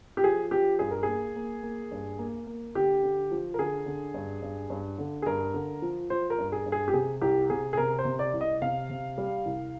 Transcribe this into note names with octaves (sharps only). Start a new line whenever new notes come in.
G4
F3 G#4
F3 G4
G2 G#4
A#4
A#3 G#4
A#3
A#3
G2
A#3
A#3
D3 G4
D3
F3
A#4
D3 G#4
D3
G2
G2
G2
D3
G#4
G2 A#4
D3
F3
F3 C5
A#4
G2
G#4
G2
G#4
G4
C3 G#4
C2 G4
C3 G#4
G#4
C3 A#4
C5
C3
D5
C2
D#5
C3 F5
C3
G3
C2